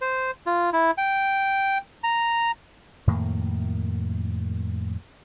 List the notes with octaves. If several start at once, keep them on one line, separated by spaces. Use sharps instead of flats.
C5
F4
E4
G5
A#5
F2 A2 D#3 A#3